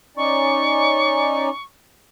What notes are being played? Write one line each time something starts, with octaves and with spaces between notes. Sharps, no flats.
C#4 D#4 D5 C#6